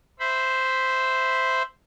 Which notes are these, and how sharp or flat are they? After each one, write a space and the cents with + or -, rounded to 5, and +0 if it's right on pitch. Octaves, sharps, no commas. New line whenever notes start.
C5 -5 E5 +0 B5 +0